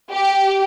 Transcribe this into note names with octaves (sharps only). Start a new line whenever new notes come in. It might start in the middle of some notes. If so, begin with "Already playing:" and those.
G4